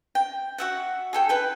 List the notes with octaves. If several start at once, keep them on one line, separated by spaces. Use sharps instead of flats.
G5
F#4 E5 F#5
G#4 A4 G5
E4 B4 G5